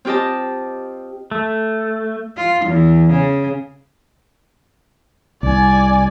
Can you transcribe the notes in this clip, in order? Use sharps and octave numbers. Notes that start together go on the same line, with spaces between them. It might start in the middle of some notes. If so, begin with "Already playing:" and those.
C4 F4 G4 D#5 A5
A3
F4
E2
C#3
C2 D5 G#5